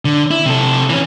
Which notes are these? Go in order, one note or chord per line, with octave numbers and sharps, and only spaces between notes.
D3
E4
C3 A4
E3 C#4